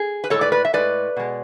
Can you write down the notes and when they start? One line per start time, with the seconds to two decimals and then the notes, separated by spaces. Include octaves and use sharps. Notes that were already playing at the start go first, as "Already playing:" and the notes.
Already playing: G#4
0.24 B4
0.30 A2 G#3 A4 C#5
0.41 B4 D5
0.52 B4 D5
0.65 E5
0.73 A2 G#3 B4 D5
1.17 B2 G#3